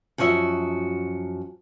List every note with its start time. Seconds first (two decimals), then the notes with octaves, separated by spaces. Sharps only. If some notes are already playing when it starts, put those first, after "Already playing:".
0.18 F#2 F3 F#4 D#5 E5